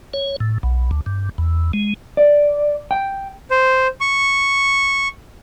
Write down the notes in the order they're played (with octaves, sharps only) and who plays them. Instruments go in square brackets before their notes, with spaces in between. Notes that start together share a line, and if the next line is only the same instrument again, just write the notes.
[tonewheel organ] C#5
A2
B1
D2
G2
E2
G#3
[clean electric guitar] D5
G5
[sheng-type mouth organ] C5
C#6